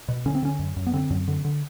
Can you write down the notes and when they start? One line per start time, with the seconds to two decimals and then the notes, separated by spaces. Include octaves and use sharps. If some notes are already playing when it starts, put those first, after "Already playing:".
0.08 B2
0.26 D3 C#4
0.35 C4
0.43 D3 C#4
0.59 F#2
0.76 F#2
0.87 B3
0.93 D3 C4
1.10 F#2
1.28 D3
1.45 D3